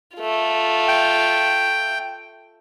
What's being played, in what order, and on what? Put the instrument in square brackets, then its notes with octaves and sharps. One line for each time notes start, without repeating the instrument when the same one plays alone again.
[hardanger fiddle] A3 F4
[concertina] G5